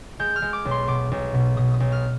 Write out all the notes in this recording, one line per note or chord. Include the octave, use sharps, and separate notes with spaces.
G#3 G6
F6
G#3
D6
B1
C6
B2 D6
B1
B2
B2 D#6
D#6
B1
F6